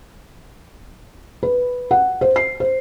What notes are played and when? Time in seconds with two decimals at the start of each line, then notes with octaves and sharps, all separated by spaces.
1.43 B4
1.91 F#5
2.21 C5
2.36 C7
2.60 C5